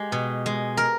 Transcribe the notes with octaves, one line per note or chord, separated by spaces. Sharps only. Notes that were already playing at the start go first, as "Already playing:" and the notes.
Already playing: G#3 G4
B2
G#3
A#4